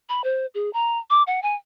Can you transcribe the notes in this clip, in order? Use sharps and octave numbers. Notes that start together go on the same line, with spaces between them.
B5
C5
G#4
A#5
D6
F#5
G#5